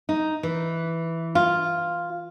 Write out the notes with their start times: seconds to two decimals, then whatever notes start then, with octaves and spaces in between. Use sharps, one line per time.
0.09 D#4
0.43 E3
1.35 F4